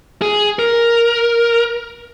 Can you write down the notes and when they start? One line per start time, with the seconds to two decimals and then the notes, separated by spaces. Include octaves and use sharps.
0.22 G#4
0.59 A#4